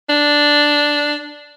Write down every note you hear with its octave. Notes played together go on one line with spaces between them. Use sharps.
D4